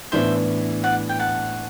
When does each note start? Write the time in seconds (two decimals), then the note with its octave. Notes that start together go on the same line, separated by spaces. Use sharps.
0.12 A2 E3 B3 D4 C5 E5
0.84 D5 F#5
1.09 G5
1.19 F#5 A5